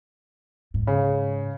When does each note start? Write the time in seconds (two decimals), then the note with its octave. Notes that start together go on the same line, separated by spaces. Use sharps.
0.74 G#2
0.87 C#3